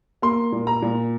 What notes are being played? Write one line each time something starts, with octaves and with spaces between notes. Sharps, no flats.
A#3 C6
A#2
A#5
A#2